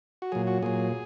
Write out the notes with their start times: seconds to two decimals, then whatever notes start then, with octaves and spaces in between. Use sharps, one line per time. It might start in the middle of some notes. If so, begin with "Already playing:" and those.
0.22 F#4
0.32 A#2 F#3 G#4
0.47 F#4
0.62 A#2 F#3 G#4